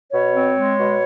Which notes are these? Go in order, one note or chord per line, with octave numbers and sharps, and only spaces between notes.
B2 C#5
C4
G#3
B2